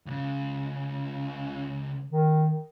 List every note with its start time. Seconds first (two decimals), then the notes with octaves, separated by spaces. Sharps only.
0.06 C#2 C#3
2.11 D#3